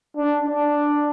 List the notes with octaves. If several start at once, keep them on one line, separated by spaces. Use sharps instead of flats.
D4
D4